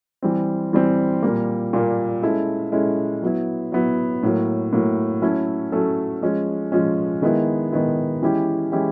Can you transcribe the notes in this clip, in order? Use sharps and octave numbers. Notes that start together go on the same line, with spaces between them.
E3 G3 C4
E3 G3 C4
A#2 G3 A#3
A#2 G3 A#3
G#3 C#4 E4 A4
G#3 C#4 E4 A4
F#3 B3 E4
F#3 B3 E4
A2 F#3 A#3
A2 F#3 A#3
F#3 A3 C#4 E4 A4
F#3 A3 C#4 E4 A4
F3 G#3 C#4
F3 G#3 C#4
D#3 G#3 B3 E4
D#3 G#3 B3 E4
E3 G#3 C#4 E4 G4
E3 G#3 C#4 E4 G4